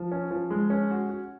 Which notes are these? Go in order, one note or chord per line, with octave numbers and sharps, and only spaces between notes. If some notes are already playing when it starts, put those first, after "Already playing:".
Already playing: F3
C#4
F3
G#3
C#4
F#4
F#4